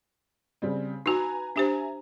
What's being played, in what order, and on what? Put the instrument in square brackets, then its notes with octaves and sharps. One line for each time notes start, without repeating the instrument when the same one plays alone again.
[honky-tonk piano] C#3 G3 C4
[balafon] D#4 F#4 [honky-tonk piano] B4 G#5 A#5
[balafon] D4 G4 C5 [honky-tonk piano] E5 G#5 A#5